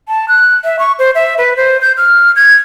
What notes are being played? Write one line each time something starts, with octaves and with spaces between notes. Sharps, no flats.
A5
F#6
E5
C#6
C5
E5
B4
C5
G6
F6
G#6